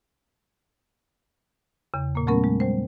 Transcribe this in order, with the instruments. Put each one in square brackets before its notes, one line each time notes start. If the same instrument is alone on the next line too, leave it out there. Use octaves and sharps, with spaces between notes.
[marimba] E2 C#3
A#2 A#3
F#3 A3 B3 C#4 A#4
G#3
G3 C5